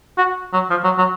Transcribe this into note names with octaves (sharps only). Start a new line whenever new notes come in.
F#4
F#3
F3
F#3
F#3